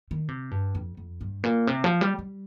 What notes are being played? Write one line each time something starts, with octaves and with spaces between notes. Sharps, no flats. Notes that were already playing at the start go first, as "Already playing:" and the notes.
D#3
C3
G2
F2
F2
G2
A#2
C3
F3
G3
G3